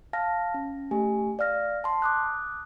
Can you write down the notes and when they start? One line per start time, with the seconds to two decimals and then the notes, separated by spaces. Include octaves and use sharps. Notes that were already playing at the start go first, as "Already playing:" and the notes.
0.13 F5 A5 F6 A#6
0.54 C#4
0.91 A3 G4 G#5
1.39 D5 F5 F6 A#6
1.84 A5 C6
2.02 D6 D#6 F#6